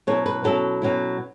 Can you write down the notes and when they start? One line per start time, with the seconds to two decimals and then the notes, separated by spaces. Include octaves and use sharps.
0.07 B2 F#3 C#4 E4 C#5
0.26 B4
0.44 B2 F#3 C#4 E4 A4
0.82 B2 F#3 C#4 E4